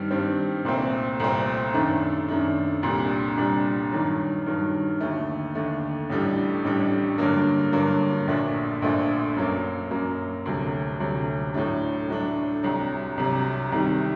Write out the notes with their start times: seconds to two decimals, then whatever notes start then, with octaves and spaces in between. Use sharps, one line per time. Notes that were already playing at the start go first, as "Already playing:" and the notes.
Already playing: G2 D#3 G3 C4
0.11 G2 D#3 G3 C4
0.65 C2 A#2 A3 C4
1.20 C2 A#2 A3 C4
1.74 F#2 D#3 A3 D4
2.28 F#2 D#3 A3 D4
2.83 C2 A#2 G3 D4
3.37 C2 A#2 G3 D4
3.92 G2 D#3 F#3
4.46 G2 D#3 F#3
5.01 D#2 D3 A3
5.55 D#2 D3 A3
6.10 A1 A2 G3 D4
6.64 A1 A2 G3 D4
7.18 G2 D3 F#3 A#3
7.73 G2 D3 F#3 A#3
8.27 A#1 A#2 A3 D4
8.82 A#1 A#2 A3 D4
9.36 F#2 F#3 A#3
9.91 F#2 F#3 A#3
10.46 D2 C3 F#3
11.00 D2 C3 F#3
11.54 A2 F#3 A3 D4
12.08 A2 F#3 A3 D4
12.63 C2 C3 F#3
13.18 C2 C3 F#3
13.72 C2 C3 D#3 G3